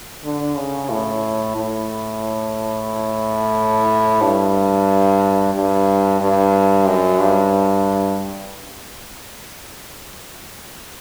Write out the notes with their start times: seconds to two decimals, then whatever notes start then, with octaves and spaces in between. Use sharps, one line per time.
0.24 D3
0.56 C#3
0.89 A2
1.56 A2
4.21 G2
5.54 G2
6.20 G2
6.86 F#2
7.19 G2